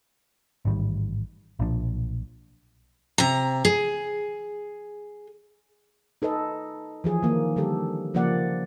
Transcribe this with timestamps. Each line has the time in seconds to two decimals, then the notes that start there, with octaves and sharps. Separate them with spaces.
0.65 A1 G#2 D#3 G3
1.59 B1 A#2 F3 D4
3.18 C3 A#5
3.65 G#4
6.22 D#4 A4 B4 D#5
7.04 E3 F3 G#4
7.23 D#3 A#3
7.56 D3 G3 G4 A4
8.14 C#3 F3 A#3 D5 F#5